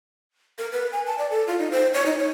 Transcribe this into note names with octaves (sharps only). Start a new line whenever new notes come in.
A#4
B4
G#5
A5
D5
A4
F4
D#4
C5
C#5
D#4
C#5